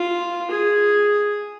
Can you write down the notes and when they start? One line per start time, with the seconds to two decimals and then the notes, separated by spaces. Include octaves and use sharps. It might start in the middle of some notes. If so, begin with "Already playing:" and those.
Already playing: F4
0.50 G#4